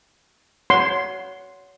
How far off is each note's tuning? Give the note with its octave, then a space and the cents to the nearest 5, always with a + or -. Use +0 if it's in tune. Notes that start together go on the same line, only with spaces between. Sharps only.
C#5 +25 F#5 +0 C6 +0